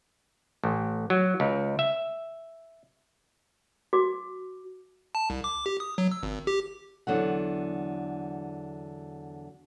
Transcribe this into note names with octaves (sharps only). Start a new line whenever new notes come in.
A1
F#3
C#2
E5
F#4 D6
A5
C2
D6
G4
D#6
F#3
E6
G#1
G4
E2 D3 F#3 F#5